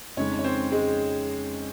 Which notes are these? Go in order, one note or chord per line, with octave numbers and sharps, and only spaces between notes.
F2 C#3 G#3 C#4 D#4 C#5
C#5
C4 C5
G#3 G#4